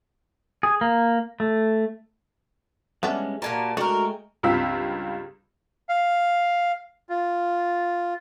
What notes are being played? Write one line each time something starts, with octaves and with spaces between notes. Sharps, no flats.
G#4
A#3
A3
E3 G3 G#3 B3 C#4 D4
A#2 A#3 F#4 G4 G#5 A5
G#3 A3 D4 F#4 A#4 G5
C#2 G2 C4 F4 E6 B6
F5
F4